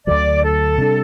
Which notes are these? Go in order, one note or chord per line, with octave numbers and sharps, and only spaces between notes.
D2 D3 F#3 D5
A4
C3 G3 D4